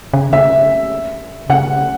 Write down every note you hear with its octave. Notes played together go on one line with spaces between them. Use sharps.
C#3
C#3 E5
C#3 F#5